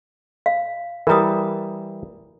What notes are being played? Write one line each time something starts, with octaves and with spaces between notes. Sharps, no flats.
F5
E3 G3 A#4 A#5 D#6